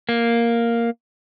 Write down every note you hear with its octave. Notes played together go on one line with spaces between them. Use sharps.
A#3